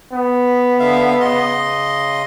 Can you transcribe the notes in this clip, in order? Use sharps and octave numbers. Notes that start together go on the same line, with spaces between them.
B3
D3 E5 F5
C#3 D#5 C6